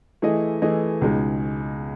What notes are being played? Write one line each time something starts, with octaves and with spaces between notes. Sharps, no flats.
E3 A3 E4 G#4 D#5
E3 A3 E4 G#4 D#5
C#2 B2 G#3 D#4